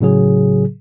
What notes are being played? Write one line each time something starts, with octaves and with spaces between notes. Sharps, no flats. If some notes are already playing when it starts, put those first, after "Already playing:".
A2 C#3 F#3 G#4